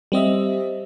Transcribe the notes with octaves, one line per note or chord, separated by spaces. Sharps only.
G3 C4 D#5 E5